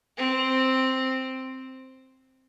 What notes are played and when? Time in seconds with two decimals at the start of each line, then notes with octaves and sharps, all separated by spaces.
0.18 C4